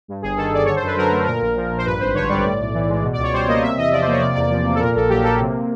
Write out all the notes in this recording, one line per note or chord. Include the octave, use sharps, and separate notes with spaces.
G2
G1 G#4
D#3 A4
G1 D5
D3 C#5
C5
F#2 B4
F#3 A#4
A3
A#2 A#4
A#1
F3
A#1
C5
G2 B4
G#1 C5
D3 C#5
G3 D5
A2
B1
E3
G#3
B2
C#2 D5
C#5
G3 C5
A#3 D#5
C3 E5
E2 D#5
F3 D5
C5
A#3 C#5
C3 D5
E2 D5
F3
A#3
A4
A#2 A#4
A#1 A4
F#3 G4
A#3 A4
C3